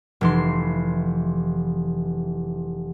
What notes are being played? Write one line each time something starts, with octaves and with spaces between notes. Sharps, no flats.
F1 E3 C6